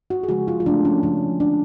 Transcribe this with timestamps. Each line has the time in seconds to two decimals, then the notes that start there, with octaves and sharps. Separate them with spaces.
0.10 F#4
0.23 G#4
0.28 C#3 F3 G#3 F#4
0.48 F4
0.60 F4
0.66 C#3 F3 A3 D4
0.85 C#4
1.02 C#3 F3 A3 C#4
1.40 D3 G#3 D4